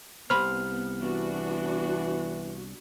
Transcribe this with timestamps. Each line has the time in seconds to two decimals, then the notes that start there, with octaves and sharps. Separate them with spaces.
0.30 C2 B3 C5 B5 F6
0.98 E3 B3 D4 F#4